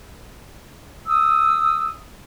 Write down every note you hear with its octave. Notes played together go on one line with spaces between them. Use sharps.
D#6 E6